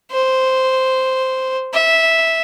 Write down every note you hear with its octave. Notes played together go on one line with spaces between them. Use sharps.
C5
E5